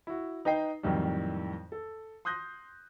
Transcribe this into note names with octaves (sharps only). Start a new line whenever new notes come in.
E4 F#4
D#4 B4 D#5 G5 C7
F2 A2 D#3 E3 F#3 G3
A4
C6 D#6 F#6 G6 A#6